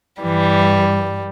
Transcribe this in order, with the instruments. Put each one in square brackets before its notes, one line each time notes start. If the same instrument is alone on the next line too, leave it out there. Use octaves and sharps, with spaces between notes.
[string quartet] G2 E3 G3